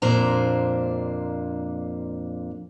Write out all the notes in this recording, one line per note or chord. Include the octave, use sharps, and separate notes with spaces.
F2 A#2 A#3 D4 C5 A#5